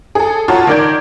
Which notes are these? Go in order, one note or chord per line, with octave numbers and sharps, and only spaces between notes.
G#4 A4
F4 F#4 C#5 A5 A#5
D#3 A#4 D5 G6 G#6